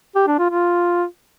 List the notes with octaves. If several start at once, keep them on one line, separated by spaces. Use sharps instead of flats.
G4
D4
F4
F4